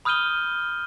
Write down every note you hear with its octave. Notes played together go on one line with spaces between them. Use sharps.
B5 D#6 F6 G6 D#7 G7